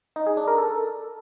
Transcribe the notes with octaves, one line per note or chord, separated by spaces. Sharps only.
D#4
G#4
D4
A#4
A4